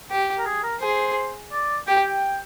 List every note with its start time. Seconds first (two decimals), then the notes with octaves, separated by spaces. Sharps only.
0.11 G4
0.38 A#4
0.46 G#4
0.63 A#4
0.81 G#4 C5
1.52 D5
1.87 G4 G5